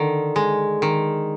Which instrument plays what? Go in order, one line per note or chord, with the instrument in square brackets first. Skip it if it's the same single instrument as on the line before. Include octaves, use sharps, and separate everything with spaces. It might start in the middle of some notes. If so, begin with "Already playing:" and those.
Already playing: [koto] D3 D#3
G#3
D#3